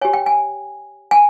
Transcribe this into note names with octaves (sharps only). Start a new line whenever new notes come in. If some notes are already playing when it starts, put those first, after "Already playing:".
G4 C#5 G#5
G5
G#5
G#5